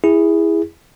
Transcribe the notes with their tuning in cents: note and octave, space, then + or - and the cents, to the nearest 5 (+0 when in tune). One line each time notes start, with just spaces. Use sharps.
E4 +0 G#4 -15